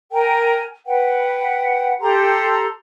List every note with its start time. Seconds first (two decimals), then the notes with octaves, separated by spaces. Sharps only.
0.12 A#4 G5 G#5
0.86 B4 F#5 G5
2.00 G4 A4 A#5 C6